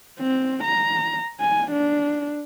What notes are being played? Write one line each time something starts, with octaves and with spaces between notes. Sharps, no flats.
C4
A#5
G#5
D4